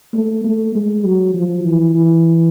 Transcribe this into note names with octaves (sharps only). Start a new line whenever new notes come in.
A3
A3
G#3
F#3
F3
E3
E3